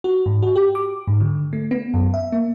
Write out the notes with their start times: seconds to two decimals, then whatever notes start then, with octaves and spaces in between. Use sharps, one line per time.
0.04 F#4
0.26 G#2
0.43 F#4
0.56 G4
0.75 D6
1.08 G#2
1.20 D3
1.53 A3
1.71 B3
1.94 F#2
2.14 E5
2.32 A#3